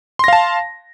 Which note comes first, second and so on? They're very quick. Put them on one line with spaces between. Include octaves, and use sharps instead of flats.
C6 A#6 F5 A5